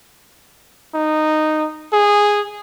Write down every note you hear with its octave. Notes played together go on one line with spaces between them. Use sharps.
D#4
G#4